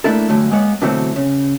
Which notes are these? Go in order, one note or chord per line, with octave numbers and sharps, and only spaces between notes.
A3 A#3 D4 E4 A4
E2 G2 D3 F#3 A3
G#3 A#3 B3 C#5 F#5
B2 D3 E3 F#3 A3 C4
C#3